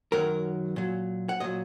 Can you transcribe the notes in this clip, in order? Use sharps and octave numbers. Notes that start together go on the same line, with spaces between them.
F#2 D#3 F#3 A#4
A#2 F#3
F#5
A#2 F#3 D#5